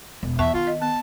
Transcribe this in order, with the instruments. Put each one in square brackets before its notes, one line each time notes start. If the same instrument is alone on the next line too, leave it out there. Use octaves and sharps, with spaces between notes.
[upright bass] E1
[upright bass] E2 [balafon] B3 A5 C#6 [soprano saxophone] E5
[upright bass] D#3 [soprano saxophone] F4
[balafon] D#5
[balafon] B3 [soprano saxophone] A5